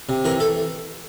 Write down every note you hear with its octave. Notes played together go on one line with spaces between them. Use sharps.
C3
E3 A#4
A4